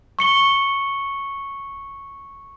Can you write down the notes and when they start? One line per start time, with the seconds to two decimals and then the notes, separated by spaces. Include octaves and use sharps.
0.19 C#6 C#7 G7